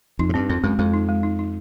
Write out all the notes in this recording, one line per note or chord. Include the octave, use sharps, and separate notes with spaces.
F2 D#4
G#2
G2 C4
F2 C4
F#2 G#3
F2 G#3
D#4
G#3
D#4
D#4